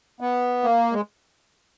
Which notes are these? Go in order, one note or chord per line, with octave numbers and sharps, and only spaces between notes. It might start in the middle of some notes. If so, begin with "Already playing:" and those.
B3
A#3
G#3